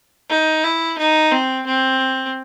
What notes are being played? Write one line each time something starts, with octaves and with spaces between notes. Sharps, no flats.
D#4
E4
D#4
C4
C4